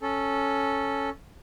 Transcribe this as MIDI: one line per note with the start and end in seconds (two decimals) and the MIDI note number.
0.01 1.10 61
0.01 1.10 69